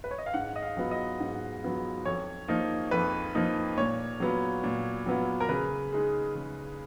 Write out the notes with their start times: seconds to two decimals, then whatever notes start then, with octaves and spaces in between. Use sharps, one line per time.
0.04 B4
0.11 C#5
0.18 D#5
0.26 F5
0.34 G#2 F#5
0.56 D#5
0.62 F5
0.77 F#3 B3 F4
0.91 D#5
1.20 G#2
1.63 F#3 B3 F4
2.05 F2 C#5
2.48 F3 A#3 D#4
2.91 F2 B4
3.35 F3 A#3 D#4
3.78 A#2 C#5
4.20 F#3 B3 F4
4.64 A#2
5.06 F#3 B3 F4
5.40 A#4
5.49 C#3 B4
5.92 G#3 D#4
6.35 C#3